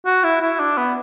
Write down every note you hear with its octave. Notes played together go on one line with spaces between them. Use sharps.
F#4
E4
E4
D4
B3